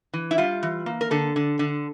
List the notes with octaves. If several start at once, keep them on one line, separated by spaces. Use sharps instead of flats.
E3
E4
G3 F4
E3
A#3
A#4
D3 A4
D3
D3